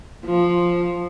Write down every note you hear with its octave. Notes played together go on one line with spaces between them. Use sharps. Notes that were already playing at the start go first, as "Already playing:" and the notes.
F3